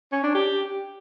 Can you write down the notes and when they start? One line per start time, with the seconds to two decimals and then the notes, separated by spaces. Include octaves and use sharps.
0.12 C#4
0.23 D4
0.35 G4